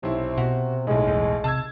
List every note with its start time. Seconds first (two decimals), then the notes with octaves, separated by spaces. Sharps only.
0.03 B1 C3 E4
0.37 B2 F#4
0.87 B1 A2 G#3
1.07 E2
1.44 C3 A5 E6 G#6